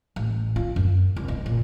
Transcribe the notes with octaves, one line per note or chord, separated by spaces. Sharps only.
A1
F4
F#2
C2
B2
A#2